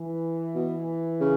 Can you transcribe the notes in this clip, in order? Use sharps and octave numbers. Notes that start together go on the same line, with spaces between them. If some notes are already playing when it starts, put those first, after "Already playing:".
Already playing: E3
B2
C#3